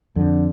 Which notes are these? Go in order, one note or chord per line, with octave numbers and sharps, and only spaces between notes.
F2 D3